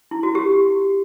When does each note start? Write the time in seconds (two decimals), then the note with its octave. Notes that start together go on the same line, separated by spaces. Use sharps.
0.11 E4
0.23 F#4
0.35 G4